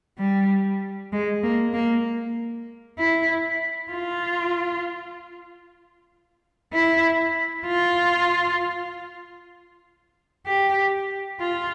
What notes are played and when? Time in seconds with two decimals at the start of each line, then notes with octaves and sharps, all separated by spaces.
0.19 G3
1.13 G#3
1.43 A#3
1.74 A#3
2.99 E4
3.92 F4
6.73 E4
7.66 F4
10.47 G4
11.40 F4